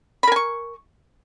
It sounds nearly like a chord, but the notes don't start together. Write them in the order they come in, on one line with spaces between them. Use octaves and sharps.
B5 A#4 G#5 C#6